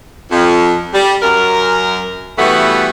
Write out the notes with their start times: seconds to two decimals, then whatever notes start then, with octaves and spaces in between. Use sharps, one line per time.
0.31 F2
0.93 G3
1.22 F#2 A#4
2.37 E3 G3 A3 B3 F#4